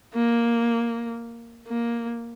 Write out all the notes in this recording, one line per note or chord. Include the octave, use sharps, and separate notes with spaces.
A#3
A#3